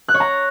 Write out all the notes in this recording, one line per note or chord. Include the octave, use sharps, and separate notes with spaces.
F#6
C#5
A#5